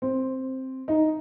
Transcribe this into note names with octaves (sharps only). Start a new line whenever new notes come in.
C4
D#4